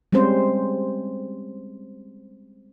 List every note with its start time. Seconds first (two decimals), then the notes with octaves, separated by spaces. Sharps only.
0.13 G3 G#3 C4 C#4 C5